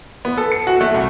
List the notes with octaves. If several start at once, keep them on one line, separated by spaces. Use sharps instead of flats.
B3
A4
C#7
F#4
A3
C2